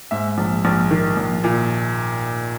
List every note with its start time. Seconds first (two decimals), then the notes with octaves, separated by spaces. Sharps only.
0.11 G#2 E5
0.38 A#1
0.65 A#1
0.91 D#3
1.17 A#1
1.44 A#2